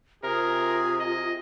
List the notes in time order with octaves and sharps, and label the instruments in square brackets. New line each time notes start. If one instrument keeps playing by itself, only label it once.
[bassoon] C3 [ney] F4 [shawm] G#4 [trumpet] A#4
[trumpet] D#5